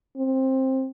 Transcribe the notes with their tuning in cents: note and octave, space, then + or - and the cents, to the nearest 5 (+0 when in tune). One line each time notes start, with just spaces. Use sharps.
C4 +15